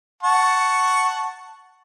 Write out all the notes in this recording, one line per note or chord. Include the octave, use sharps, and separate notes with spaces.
F#5 A5 C#6